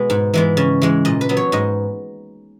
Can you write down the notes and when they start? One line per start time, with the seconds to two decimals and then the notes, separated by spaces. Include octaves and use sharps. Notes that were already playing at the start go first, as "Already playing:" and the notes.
Already playing: B2 G#3 B3
0.10 G#2
0.34 E3 G#3 B3
0.57 C#3
0.82 E3 G#3
1.05 A#2 D#5
1.21 B4
1.29 F#3 B3
1.37 C#5
1.52 G#2 D#5